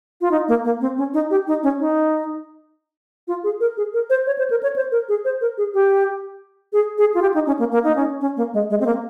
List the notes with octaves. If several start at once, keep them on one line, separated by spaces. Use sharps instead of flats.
F4
D#4
A#3
A#3
C4
C#4
D#4
G4
D#4
C#4
D#4
F4
G#4
A#4
G#4
A#4
C5
C#5
C5
A#4
C#5
C5
A#4
G#4
C5
A#4
G#4
G4
G#4
G#4
F4
G4
D#4
C#4
A#3
A#3
D#4
C#4
C#4
A#3
G#3
G#3
C4
A#3